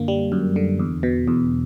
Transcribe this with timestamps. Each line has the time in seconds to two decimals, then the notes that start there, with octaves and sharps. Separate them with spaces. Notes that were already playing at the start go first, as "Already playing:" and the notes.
Already playing: F#2 D3 A#3
0.08 G3
0.32 F#2
0.56 D3
0.79 E2
1.03 B2
1.27 E2